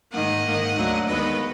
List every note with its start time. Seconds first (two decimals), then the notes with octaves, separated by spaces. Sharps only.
0.12 G#2 D#3 A#3 D#5 F#5
0.44 G#2 D#3 A#3
0.76 D2 D3 F#3 A#3
1.07 D#2 D#3 G#3 B3 B4 D#5